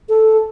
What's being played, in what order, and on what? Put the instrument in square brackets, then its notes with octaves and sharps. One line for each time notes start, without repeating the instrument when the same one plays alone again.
[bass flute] A4